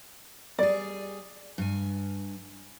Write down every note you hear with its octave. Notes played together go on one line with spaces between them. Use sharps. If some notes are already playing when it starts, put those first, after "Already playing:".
G3 G#4 D5
G2 G#5